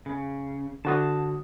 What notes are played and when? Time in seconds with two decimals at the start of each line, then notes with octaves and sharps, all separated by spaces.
0.06 C#3
0.85 D3 F#4 A5 D#6